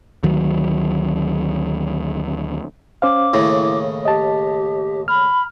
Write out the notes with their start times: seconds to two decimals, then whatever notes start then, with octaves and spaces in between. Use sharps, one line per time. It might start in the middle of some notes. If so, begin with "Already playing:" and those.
0.23 D2 D#3 F#3
3.02 C#4 C5 F5 D6
3.33 D#2 A2 C#3 E4
4.05 G4 D#5 A5
5.08 B5 F6